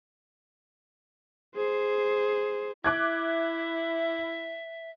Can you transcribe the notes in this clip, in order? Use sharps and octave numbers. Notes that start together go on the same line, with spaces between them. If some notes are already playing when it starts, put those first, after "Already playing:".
G#4 C5
E4 E5 D6 F#6 G#6